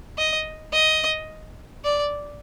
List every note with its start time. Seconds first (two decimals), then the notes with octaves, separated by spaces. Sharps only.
0.18 D#5
0.73 D#5
1.85 D5